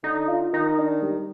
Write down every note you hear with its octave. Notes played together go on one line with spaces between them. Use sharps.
D3 D#4
F4
D#3 D#4
D4
G3